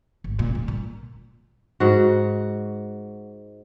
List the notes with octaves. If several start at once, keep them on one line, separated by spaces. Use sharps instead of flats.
G#1
A#2
G3
A#2
G#2 F#4